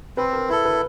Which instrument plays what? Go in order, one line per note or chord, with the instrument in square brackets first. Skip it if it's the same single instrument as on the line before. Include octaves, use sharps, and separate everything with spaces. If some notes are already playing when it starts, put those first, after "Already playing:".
[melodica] C4 [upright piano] B4
[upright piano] A#4
[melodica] E4 [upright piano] B4
[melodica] A4
[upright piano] B4